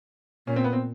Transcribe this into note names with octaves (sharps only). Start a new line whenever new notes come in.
A#2 C#4
C4
B3
C4